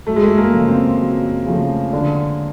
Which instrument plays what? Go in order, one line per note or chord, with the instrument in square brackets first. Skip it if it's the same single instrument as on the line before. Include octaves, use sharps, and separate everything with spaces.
[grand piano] F#2 [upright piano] A3
[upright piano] G#3
A3
A#3
[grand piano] C#3 F3 A3
[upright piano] C4
[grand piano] F#2
C#3 F3 A3
D3